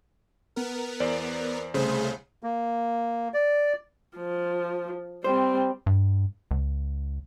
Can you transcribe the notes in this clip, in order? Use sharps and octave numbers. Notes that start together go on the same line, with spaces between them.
B3 A#4
E2 C5 D5
C2 C#3 A3 G#4 C5
A#3
D5
F3
G3 C4 C5
G2
C#2